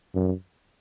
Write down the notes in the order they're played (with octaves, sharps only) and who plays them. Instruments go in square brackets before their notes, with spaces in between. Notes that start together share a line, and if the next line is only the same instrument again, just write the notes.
[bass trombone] F#2